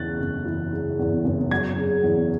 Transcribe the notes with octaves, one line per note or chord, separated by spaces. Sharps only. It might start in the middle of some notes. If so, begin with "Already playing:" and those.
Already playing: E2 C#3 F#6 A6
F#1
E3
C#3
E2
F#1
F#3 G#6
C#3
E2